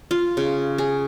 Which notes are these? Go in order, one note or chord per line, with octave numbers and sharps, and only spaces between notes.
F4
C#3
G#4